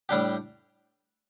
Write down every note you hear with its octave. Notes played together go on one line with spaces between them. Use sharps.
A2 G3 D4 G4